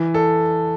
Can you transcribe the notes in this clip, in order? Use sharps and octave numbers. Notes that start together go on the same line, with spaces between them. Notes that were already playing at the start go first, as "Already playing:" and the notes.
Already playing: E3
A4